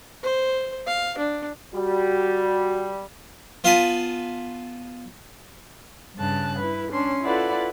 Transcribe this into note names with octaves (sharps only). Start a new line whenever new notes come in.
C5
F5
D4
G3 F#4
B3 F4 F5 G#5 A5 B5
G2 C#3 A5 F#6
E4 B4
C#4 D4 C6
E4 F4 A4 B4 D5 F#5